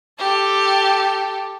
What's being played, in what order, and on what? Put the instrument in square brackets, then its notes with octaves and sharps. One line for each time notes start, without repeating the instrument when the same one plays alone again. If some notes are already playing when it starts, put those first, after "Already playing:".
[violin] G4 A4